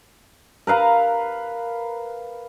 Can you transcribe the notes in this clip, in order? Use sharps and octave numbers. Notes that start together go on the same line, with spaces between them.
A#4 B4 F5 A#5